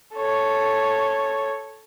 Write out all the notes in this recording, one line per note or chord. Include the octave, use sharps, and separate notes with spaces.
A4 C#5